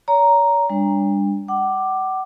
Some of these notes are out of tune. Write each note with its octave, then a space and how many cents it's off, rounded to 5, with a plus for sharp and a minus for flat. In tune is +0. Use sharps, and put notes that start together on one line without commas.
C#5 +40 A#5 +0
G3 +40 D4 +0
F#5 +35 D6 +10